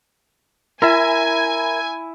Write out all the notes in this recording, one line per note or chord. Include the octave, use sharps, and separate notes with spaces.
E4 A#4 E5 G#5 G#6